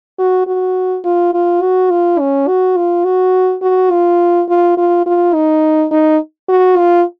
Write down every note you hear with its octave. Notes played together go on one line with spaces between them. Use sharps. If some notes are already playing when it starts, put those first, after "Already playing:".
F#4
F#4
F4
F4
F#4
F4
C#4
F#4
F4
F#4
F#4
F4
F4
F4
F4
D#4
D#4
F#4
F4